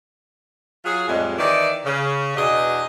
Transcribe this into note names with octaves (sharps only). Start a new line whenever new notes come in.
F#3 F4 G#4
F2 A2 G3 G#3
D#3 E3 D5
C#3
E2 B2 D4 D#5